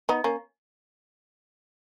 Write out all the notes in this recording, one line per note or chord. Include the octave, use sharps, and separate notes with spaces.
B3 D#4
A#3 C#4